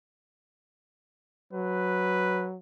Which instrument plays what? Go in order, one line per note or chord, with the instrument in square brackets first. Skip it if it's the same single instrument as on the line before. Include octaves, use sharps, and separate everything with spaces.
[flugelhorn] F#3 [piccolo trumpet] B4